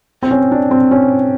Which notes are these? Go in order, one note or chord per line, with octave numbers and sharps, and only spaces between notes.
C4
C#4
D4
C4
C#4